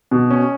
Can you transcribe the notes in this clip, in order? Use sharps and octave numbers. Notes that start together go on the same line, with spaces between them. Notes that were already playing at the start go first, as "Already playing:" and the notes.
B2
C#4